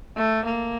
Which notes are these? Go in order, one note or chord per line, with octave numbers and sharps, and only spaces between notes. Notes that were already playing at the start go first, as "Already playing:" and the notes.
A3
A#3